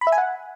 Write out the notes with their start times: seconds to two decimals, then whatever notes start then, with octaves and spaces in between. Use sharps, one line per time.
0.01 B5
0.07 E5
0.12 G#5
0.18 F#5